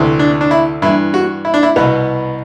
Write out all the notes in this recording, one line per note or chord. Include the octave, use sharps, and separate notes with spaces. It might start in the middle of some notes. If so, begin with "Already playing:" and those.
Already playing: D2 C3 E3
D4
D4
E4
G2 E3 E4
F#4
E4
D4
E4
C2 B2 B3